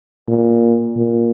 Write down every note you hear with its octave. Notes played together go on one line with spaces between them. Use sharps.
A#2
A#2